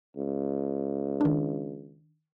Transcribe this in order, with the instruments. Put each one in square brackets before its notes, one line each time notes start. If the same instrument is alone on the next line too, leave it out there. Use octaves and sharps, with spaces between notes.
[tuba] C#2
[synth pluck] D#3 D4